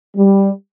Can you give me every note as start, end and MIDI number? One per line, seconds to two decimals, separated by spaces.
0.16 0.51 55